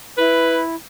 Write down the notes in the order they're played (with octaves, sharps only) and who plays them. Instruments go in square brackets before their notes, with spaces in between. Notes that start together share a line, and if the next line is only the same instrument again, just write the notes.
[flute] E4 [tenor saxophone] B4